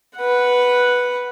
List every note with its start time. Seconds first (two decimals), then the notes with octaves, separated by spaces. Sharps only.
0.18 B4 F#5